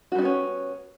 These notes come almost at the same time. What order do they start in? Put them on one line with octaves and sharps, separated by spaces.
F#4 G3 D#4 B3 C#4